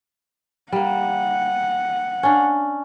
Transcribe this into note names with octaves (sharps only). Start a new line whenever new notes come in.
G3 A#3 F#5
C#4 D4 F5